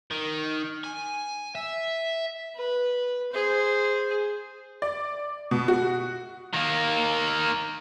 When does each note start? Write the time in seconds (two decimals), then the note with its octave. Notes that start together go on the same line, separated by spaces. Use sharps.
0.11 D#3
0.84 G#5
1.55 E5
2.55 B4
3.32 G#4 C5
4.82 D5
5.51 B2
5.68 F#4
6.53 D#3 A#3